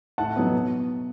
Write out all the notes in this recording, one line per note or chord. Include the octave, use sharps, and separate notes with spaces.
A2 F#5 A5
F#3 B3 D#4
B2